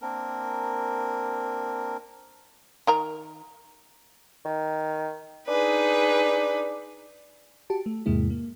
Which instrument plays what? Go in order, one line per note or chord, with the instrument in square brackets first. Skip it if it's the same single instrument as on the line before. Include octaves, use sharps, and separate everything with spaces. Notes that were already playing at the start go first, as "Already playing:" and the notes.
[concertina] A#3 C4 D4 A#4
[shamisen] D#3 A#4 A#5
[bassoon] D#3
[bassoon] D4 [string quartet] D#4 G#4 B4
[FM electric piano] F#4 G4 A5
A3
E2 G#2 C3 G#3 A#3 E4
A#3